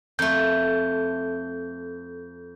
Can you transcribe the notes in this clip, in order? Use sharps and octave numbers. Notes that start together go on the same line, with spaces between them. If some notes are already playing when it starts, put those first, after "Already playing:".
F2 A3 G6